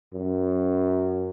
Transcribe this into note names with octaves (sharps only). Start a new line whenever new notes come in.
F#2